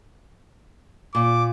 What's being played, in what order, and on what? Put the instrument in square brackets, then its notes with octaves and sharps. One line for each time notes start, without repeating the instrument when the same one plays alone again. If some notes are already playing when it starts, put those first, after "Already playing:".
[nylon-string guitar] A#2 [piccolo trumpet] D6